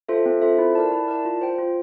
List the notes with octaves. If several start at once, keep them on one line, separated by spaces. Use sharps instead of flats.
F4 A4 C5 E5
C4
F4 A4 C5 E5
E4
A#4 D5 A5
E4
A#4 D5 A5
F4
C5 G5
F4